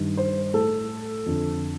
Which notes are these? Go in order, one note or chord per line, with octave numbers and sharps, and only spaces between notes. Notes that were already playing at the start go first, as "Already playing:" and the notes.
Already playing: G2 D#3
C5
A2 A4
F2 D3